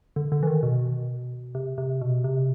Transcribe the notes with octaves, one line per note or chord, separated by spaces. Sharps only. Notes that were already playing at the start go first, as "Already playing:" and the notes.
D3
D3
E3
D#3
B2
C3
C3
B2
C3